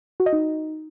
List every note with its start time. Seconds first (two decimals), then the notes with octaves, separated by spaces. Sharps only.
0.20 F#4
0.26 D#5
0.33 D#4